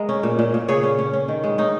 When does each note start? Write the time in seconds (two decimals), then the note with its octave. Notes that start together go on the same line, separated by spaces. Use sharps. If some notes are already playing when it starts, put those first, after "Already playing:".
Already playing: G#3 A#4 D#5
0.09 C#4
0.23 A#2
0.39 A#2
0.54 A#2
0.68 C#3 G#4 C#5
0.83 C#4
0.99 C#4
1.13 C#4
1.28 D#3
1.43 G#3
1.58 C#4 D#4